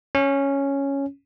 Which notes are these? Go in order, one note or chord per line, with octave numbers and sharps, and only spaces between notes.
C#4